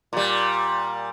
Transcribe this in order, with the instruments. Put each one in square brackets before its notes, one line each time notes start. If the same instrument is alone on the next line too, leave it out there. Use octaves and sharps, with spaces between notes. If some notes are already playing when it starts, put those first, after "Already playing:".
[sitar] A#2 G3